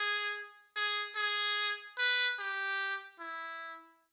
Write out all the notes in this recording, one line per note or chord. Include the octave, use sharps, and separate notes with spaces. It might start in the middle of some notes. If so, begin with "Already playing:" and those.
Already playing: G#4
G#4
G#4
B4
G4
E4